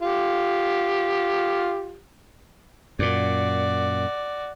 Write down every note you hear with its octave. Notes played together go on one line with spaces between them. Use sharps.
F4 G4
F#2 A#2 F#4 D5